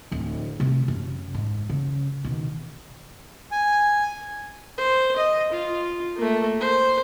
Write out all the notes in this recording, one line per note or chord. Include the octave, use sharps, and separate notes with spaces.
D1 F2
C3 A3
F#2
G#2
C#3
B2 D#3
G#5
C5
D#5
F4
A3 A#3
C5